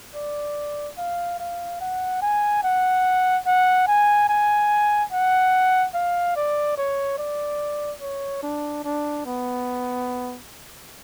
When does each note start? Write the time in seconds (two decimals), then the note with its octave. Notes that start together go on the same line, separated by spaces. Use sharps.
0.15 D5
0.98 F5
1.40 F5
1.81 F#5
2.22 G#5
2.64 F#5
3.46 F#5
3.87 G#5
4.29 G#5
5.12 F#5
5.94 F5
6.36 D5
6.77 C#5
7.18 D5
8.01 C#5
8.43 D4
8.84 D4
9.26 B3